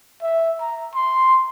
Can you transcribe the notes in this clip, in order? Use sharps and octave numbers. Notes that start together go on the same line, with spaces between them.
E5
A#5
C6